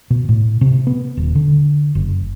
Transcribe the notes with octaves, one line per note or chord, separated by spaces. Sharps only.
B2
A2
C3
B3
D#1
D3
F#1